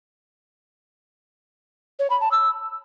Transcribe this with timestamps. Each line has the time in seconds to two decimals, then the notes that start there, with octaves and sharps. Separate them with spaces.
1.99 C#5
2.10 B5
2.21 A5
2.32 E6